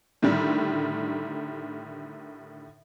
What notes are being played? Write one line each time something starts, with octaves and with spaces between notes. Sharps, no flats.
A2 D3 D#3 G3